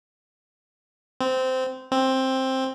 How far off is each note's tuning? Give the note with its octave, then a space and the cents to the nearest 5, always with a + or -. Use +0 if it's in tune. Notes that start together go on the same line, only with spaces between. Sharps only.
C4 -15
C4 +10